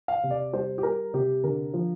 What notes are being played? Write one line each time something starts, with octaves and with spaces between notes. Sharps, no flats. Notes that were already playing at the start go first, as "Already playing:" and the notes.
F5
C3
D5
G3 C5
G4
G3 A#4
C3 G4
D3 A#4
F3